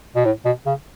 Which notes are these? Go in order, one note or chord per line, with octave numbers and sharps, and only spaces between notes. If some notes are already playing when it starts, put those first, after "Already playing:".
B2
A2
B2
C#3